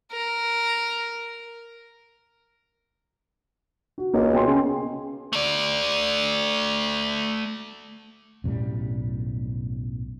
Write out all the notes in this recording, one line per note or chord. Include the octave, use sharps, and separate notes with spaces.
A#4
F#4
C#2 A#3
B2 G5 G#5 C6
C#3
A3 D5
B1 F#2 A2 G3